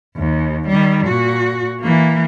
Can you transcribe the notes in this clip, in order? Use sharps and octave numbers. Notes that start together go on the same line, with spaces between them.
D#2
D#3 G3
A#2 F#4
E3 A#3